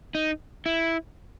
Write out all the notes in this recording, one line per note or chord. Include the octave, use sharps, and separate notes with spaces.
D#4
E4